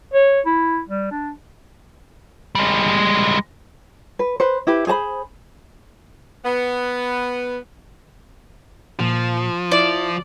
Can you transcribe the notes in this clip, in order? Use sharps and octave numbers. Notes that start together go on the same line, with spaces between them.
C#5
E4
G3
D4
G3 G#3
B4
B4 C5
E4 G4 B4
G#4 C5 A5 B5
B3
A#2 F3
E4 D5